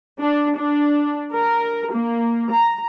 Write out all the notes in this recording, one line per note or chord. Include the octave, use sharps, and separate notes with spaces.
D4
D4
A#4
A#3
A#5